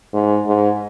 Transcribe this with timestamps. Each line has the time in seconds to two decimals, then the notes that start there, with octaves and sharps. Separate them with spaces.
0.14 G#2
0.46 G#2